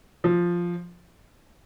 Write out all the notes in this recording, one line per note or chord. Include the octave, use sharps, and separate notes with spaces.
F3